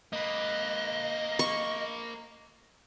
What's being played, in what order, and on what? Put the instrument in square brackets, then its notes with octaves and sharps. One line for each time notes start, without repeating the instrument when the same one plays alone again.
[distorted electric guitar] A#3 B4 [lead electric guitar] D#5
[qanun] C#6